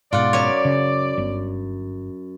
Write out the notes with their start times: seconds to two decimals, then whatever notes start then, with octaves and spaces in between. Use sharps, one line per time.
0.13 G#2 B2 F4 D5 F#5
0.33 F#2 C#5
0.65 C#3
1.18 G1